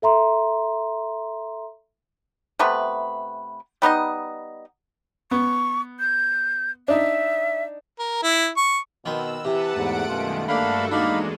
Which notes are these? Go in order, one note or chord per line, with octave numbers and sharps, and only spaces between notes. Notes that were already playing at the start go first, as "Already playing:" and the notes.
A4 E5 A#5 C6
C3 A3 B3 B4
G3 B3 D#4 D#5
B3 C#6
G6
D4 D#4 E5
A#4
E4
C#6
B2 D#3 B3 C4 E6
C3 E3 B4 F#5 A5
E2 G#2 A3 F#5 D7
F#2 B2 D#3 G3 G#3 F4
G2 D3 A#3 D4 F#4 A4 F5 B5
E2 G#3 A#3 D4 D#4 F5 B5